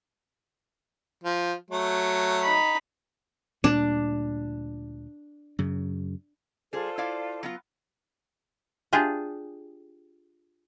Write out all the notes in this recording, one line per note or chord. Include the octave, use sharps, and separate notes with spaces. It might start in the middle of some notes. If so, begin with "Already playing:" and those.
F3
F#3 A3
D#4 B5
D2 A#2 G3 D4
F#2 C#3
G3 F4 G#4 A4 C5
E4 D5 F5
F#3 B3 F4
D4 F4 G4 G#4